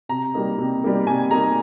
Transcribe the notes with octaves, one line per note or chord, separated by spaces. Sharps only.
C3 A#5
G3 A#3 D#4
C3
G3 A#3 D#4
C3 G#5
G3 A#3 D#4 A#5